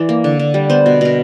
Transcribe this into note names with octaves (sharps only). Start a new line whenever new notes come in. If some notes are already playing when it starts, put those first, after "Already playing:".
Already playing: E3 D5
A#3
D3
D3
G3
B3 C5
B2
B2 A#4